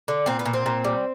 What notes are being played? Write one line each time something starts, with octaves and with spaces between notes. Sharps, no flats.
D3
A#2 C4
B3
A#2
C4
A#2
G3